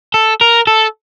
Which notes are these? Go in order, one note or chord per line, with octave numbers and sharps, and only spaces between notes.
A4
A#4
A4